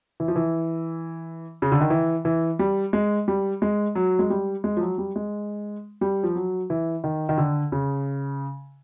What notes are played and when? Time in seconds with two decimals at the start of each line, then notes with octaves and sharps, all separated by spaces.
0.20 E3
0.28 F3
0.36 E3
1.62 C#3
1.72 D3
1.81 D#3
1.90 E3
2.25 E3
2.59 G3
2.93 G#3
3.28 G3
3.62 G#3
3.95 F#3
4.19 G#3
4.30 G3
4.64 G#3
4.77 F3
4.81 F#3
4.98 G3
5.16 G#3
6.01 G3
6.24 F3
6.36 F#3
6.70 E3
7.04 D#3
7.29 D#3
7.38 D3
7.72 C#3